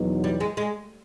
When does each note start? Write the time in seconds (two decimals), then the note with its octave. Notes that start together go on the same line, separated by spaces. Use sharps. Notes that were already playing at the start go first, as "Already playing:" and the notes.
Already playing: E2 B2 F#3 B3 D#4
0.24 G3
0.40 G#3
0.57 G#3